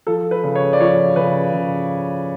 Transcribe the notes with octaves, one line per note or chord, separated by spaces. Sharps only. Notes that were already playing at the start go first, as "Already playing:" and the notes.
F3 A4
B4
C#3
C#5
D5
F3 C#5
C#3 B4
C#3